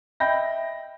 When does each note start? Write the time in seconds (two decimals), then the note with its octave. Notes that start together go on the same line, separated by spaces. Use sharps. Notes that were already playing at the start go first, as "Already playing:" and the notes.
0.20 D#5 E5 G5 B5 G6 A#6